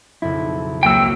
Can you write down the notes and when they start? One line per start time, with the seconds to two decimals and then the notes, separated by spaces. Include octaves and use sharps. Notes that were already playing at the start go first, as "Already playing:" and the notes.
0.22 B1 F2 C#3 E4
0.83 C#2 F#3 A#3 G5 E6